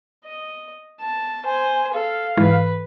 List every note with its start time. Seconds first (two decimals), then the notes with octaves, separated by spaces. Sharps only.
0.25 D#5
1.01 A5
1.46 C5 G#5
1.94 A4 F5
2.37 G#2 E3 B4